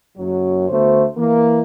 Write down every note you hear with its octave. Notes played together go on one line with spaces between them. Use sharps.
F#1 F#2 F#3
D2 D3 A3 B3 F#4 C5
E3 A#3